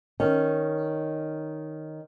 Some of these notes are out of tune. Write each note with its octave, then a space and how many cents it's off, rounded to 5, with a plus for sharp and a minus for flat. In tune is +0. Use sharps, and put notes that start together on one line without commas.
D#3 +0 C#4 +0